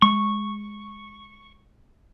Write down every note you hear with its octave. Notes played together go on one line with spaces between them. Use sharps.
G#3 C#6